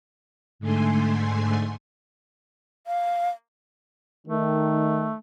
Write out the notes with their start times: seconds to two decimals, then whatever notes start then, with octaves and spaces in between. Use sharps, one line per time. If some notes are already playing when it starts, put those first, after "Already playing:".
0.59 G#2 D3 A3 G#5 C6
2.87 F5
4.27 D#3 A3